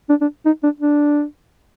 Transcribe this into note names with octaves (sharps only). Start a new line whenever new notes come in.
D4
D4
D#4
D4
D4